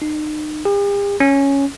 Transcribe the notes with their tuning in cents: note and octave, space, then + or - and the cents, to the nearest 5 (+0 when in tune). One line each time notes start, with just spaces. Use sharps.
D#4 -35
G4 +45
C#4 +0